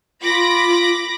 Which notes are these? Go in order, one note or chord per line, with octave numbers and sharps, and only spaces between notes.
F4 B5 D6 A#6